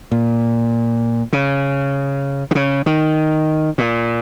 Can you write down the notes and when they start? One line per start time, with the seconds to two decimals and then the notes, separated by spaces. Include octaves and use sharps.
0.12 A#2
1.33 C#3
2.51 D#3
2.55 C#3
2.86 D#3
3.78 A#2